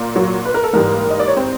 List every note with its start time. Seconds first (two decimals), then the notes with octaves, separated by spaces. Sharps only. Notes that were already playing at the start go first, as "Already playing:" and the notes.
Already playing: A#2 A#3
0.16 F#3 F#4
0.45 B4
0.54 A#4
0.63 A4
0.73 G#2 E3 G3 A#3 A#4
1.10 D#5
1.19 D5
1.28 C#5
1.37 C4 C5